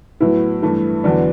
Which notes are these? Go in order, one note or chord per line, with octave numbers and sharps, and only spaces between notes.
A2 F#3 B3 E4
G2 E3 A3 E4
E2 D3 F#3 B3 D4